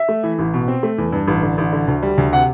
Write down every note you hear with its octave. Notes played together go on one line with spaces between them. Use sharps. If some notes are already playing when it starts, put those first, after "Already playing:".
Already playing: E5
A3
E3
A1
B2
C4
A3
E2
G2
A1
D3
A1
D3
D2
G3
D2
C3 F#5